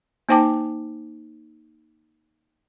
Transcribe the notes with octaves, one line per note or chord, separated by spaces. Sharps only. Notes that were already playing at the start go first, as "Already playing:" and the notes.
A#3 D#4 C5 G5 A5 D6